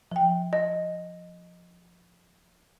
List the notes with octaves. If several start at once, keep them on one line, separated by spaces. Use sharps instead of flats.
F3 G5
D#5